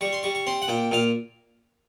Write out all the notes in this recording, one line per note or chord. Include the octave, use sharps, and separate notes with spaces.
G3 C#6
C6
G3 C#6
C#6
C4 C6
F#5
A#2 G5
A#2 F5